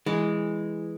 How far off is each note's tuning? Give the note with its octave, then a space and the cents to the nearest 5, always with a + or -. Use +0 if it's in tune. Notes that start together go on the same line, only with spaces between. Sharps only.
E3 +0 G#3 -5